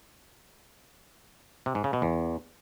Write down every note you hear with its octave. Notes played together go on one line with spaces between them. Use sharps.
C3
G#2
C#3
B2
E2